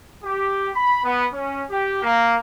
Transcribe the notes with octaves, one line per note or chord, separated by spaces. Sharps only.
G4
B5
B3
C#4
G4
A#3